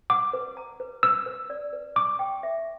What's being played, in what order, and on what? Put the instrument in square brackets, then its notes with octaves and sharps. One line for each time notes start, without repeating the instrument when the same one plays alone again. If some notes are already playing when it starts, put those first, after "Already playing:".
[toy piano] F#5 [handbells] D6
[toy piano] B4
A#5
B4
[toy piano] B4 [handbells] E6
[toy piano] B4
D5
B4
[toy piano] C#6 [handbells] D6
[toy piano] G5
E5